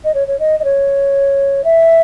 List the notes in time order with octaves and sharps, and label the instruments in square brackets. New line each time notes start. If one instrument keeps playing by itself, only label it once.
[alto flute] D#5
C#5
C#5
D#5
D#5
C#5
E5